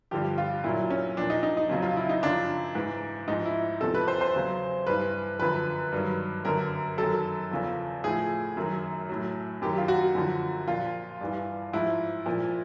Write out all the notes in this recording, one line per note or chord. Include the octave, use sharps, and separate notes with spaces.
G2 D3 F3 G4
F4
A#2 F#3 E4
C#4
A#2 F3 D4
D#4
D#4
D#4
F2 C#3 F#3
F4
E4
D#4
F#2 C#3 F3 D4
G#2 E3
G#2 F3 D#4
E4
E2 C3 F3 A4
B4
C5
C5
E2 C#3 F#3
G2 E3 B4
F#2 D3 F3 B4
G2 D#3 F#3
F#2 D3 F#3 A#4
F#2 D#3 F#3 A4
E2 C#3 F3
A2 F3 G#4
F#2 D#3 F#3
A2 F#3
F#2 D#3 F#3 G4
F4
F#4
F#2 D3 F3
A#2 F3 F4
G2 E3
G#2 F3 E4
A#2 F3